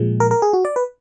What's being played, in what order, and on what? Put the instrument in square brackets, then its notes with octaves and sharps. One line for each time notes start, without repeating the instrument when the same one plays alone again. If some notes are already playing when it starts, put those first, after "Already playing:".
Already playing: [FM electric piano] A#2 F3 G#3
A#4
A#4
G#4
F#4
D5
B4